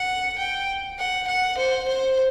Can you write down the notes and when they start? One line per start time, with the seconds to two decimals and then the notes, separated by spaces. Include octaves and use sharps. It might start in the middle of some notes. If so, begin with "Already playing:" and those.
Already playing: F#5
0.38 G5
0.98 F#5
1.27 F#5
1.57 C5
1.88 C5